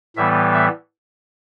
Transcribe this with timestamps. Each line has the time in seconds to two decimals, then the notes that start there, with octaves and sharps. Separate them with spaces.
0.16 A2 E3 G3 B3 E5
0.54 E5